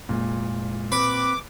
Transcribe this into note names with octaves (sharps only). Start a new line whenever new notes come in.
F1 A#2 G#3
C4 B4 D6